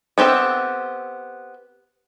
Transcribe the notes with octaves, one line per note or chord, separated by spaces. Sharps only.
B3 C4 G4 A4 E5